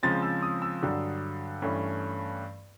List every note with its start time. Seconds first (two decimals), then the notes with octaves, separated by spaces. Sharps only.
0.03 C#3 F3 G#3 C4 A6
0.22 E6
0.43 D#6
0.62 E6
0.83 G2 D3 F#3
1.62 G2 E3 A3 C#4